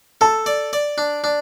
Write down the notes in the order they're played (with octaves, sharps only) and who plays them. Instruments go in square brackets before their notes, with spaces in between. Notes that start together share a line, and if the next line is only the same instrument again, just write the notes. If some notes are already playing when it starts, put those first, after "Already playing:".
[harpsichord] A4 [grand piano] A5
[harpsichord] D5
D5
D4
D4